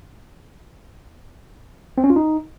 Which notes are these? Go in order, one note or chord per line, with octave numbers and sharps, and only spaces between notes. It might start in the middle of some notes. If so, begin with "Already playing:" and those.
C4
C#4
F4
D#4